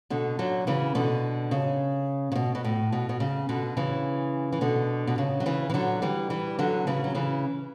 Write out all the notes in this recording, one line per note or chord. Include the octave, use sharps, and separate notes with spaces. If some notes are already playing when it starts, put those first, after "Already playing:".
B2 D3
D3 F#3
C#3 E3
B2 D3
C#3
C#3
B2
B2
A2
B2
B2
C#3
B2 D3
C#3 E3
E3
B2 D3
B2
C#3
F#3
C#3 E3
E3
D3 F#3
E3 G3
E3 G3
D3 F#3
C#3 E3
F#3
C#3 E3